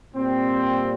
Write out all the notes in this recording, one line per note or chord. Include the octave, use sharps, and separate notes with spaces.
A#2 G3 C4